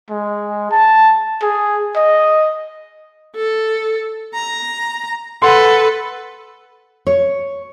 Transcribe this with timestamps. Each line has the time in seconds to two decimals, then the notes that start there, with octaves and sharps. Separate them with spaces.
0.10 G#3
0.71 A5
1.42 G#4
1.96 D#5
3.36 A4
4.34 A#5
5.42 A4 B4 F#5 C6
7.07 C#5